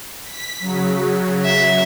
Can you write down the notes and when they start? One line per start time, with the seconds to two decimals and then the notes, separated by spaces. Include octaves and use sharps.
0.24 B6
0.60 C#3 F#3
1.45 E5